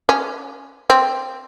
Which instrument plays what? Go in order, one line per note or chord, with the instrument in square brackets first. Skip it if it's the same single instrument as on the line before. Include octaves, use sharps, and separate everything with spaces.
[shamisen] C#4
C4